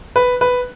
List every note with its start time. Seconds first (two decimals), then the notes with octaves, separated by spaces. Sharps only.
0.16 B4
0.41 B4